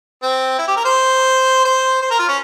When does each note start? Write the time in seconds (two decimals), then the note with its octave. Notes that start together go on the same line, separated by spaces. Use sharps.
0.23 C4
0.58 E4
0.68 G4
0.77 A#4
0.85 C5
1.65 C5
2.02 C5
2.11 A#4
2.19 F4
2.28 C#4